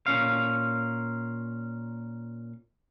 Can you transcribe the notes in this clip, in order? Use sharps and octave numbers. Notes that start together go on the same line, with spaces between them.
A#2 C#4 F5